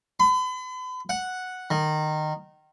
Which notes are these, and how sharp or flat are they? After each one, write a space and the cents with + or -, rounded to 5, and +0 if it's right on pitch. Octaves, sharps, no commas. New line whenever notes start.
B5 +40
F#5 -5
D#3 -20